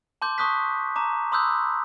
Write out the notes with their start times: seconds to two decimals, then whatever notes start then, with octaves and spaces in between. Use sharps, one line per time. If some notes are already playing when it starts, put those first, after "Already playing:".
0.22 A5 C6 D6 G6
0.38 A5 C#6 D#6 F#6 B6
0.96 A5 A#5 D6
1.32 B5 C6 D#6 E6 F#6 G6